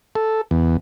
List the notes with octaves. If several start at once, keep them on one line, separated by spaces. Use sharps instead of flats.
A4
E2